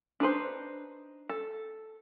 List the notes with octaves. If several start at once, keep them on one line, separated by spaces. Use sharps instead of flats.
D4 D#4 B4 C5
A4